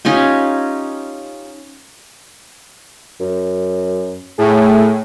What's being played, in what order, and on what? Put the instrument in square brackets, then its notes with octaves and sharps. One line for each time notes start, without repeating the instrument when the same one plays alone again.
[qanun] C#4 D#4 F4 G4
[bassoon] F#2
[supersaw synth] A2 [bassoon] G#4